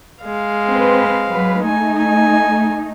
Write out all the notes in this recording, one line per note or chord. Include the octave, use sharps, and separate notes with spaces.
G#3 F5
C4 B4
F#3 B4
A3 D#4 G#5
G#5